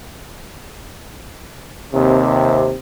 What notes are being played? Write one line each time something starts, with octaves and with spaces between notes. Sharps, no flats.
D#2 C3